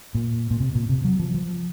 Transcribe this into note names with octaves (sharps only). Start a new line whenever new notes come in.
A#2
A#2
C3
A#2
C3
F#3
F3
F3